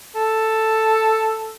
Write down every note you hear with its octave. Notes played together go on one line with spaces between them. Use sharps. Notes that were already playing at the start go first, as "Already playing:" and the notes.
A4